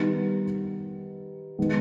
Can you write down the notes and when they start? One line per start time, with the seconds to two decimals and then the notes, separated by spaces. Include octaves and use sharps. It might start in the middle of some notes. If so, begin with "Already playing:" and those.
Already playing: D#3 G3 B3 D#4
1.58 D#3 G#3 B3